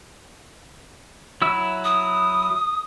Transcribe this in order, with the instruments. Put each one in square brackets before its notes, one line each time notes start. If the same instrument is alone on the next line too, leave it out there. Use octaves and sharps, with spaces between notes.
[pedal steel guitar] F#3 E4 E6
[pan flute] D#6